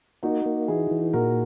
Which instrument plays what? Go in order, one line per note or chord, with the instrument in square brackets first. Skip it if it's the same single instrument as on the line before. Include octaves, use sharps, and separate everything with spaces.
[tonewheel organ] A#3 [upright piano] D#4 F#4
[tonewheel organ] A#3
[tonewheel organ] E3 [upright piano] E4 G#4
[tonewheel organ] E3
[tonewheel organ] A#2 [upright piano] F#4 A#4